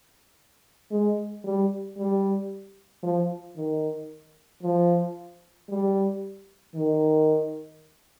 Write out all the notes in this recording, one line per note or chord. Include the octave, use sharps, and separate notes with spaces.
G#3
G3
G3
F3
D#3
F3
G3
D#3